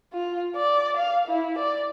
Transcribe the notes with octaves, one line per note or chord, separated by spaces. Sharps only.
F4
D5
F5
E4
D5